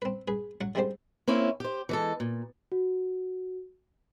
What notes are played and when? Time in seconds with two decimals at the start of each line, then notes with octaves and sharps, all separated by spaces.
0.02 C4 B4
0.28 G#4 B4
0.61 F#3 F#4 F#5
0.75 D3 G3 G#3 C4 G4 C5
1.27 A#3 C4 C#4 E4
1.60 G4 C5
1.89 E3 G#3 A4
2.20 A#2
2.72 F#4